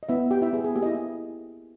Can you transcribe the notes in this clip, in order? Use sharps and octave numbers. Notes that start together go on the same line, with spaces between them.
D#5
B3 E4 E5
G4 G5
E4 E5
B3 G#4
G#4
A#3 G4 A#4
D#5
E4 E5